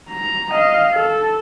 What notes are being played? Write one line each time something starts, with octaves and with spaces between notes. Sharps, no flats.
A#5
D#5 F5
A4